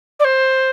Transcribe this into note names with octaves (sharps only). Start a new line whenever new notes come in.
D5
C5